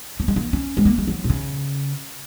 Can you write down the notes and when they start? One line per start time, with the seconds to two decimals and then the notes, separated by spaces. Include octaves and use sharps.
0.20 A#3
0.28 G#3
0.36 A#3
0.53 C#4
0.77 G#3
0.85 A#3
0.98 G#3
1.07 F#3
1.24 A#2
1.30 C#3